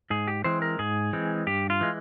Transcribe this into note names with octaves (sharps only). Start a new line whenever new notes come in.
G#2 G#4
G4
E3 G#3 C4 C5
A#4
G#2 G#4
E3 G#3 C4
G2 G4
F4
E3 G#3